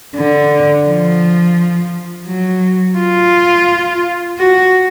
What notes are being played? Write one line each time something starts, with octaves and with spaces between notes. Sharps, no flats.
D3
F3
F#3
F4
F#4